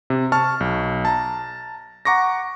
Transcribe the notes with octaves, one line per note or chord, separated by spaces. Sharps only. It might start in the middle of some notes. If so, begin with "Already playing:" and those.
C3
A5 C#6 F6
B1
A5 A#5
F#5 A#5 C#6 D6 A#6